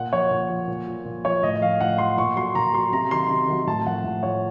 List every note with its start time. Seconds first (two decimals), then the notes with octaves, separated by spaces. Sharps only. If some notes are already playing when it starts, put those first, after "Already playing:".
Already playing: A#2 F#5
0.13 F3 C#5
0.31 A#2
0.49 F3
0.68 A#2
0.87 F3
1.05 A#2
1.25 F3 C#5
1.43 A2 D#5
1.62 F3 F5
1.80 A2 F#5
1.98 F3 C6
2.18 A#2 C#6
2.36 F#3 C6
2.55 A#2 A#5
2.73 F#3 C6
2.93 C3 A#5
3.11 D#3 F#3 C6
3.30 C3
3.48 D#3 F#3
3.67 A2 A5
3.86 F3 F#5
4.04 A2
4.23 F3 C#5